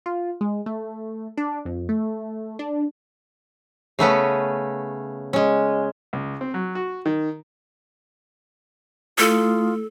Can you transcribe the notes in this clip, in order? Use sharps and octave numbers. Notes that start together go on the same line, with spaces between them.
F4
G#3
A3
D4
F2
A3
D4
C#3 A3 B3 C#4
G#3 C#4
C#2
C4
F#3
F#4
D#3
A3 E4 F4 A4 D#6